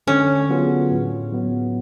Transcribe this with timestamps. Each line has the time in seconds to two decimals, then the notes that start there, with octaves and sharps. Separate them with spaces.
0.07 D3 C#4
0.49 F#3 B3 F4 G#4
0.92 A2
1.33 F#3 B3